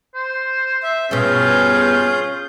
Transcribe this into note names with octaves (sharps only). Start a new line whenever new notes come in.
C5
E5
G2 B2 C#4 F4 G#4 G6